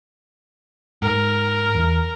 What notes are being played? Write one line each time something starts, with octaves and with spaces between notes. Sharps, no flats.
G#2 A#4
E2